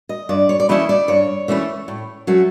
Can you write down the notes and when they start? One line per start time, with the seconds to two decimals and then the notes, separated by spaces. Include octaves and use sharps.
0.09 D#5
0.29 G2 D5
0.49 C#5
0.60 D5
0.69 E3 A3 C#4 E4 D#5
0.89 D5
1.08 G2 C#5
1.48 E3 A3 C#4 E4
1.88 A2
2.27 F#3 A3 C#4